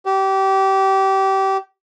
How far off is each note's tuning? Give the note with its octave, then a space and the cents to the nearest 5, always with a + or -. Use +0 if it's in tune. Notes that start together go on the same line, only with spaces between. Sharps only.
G4 -25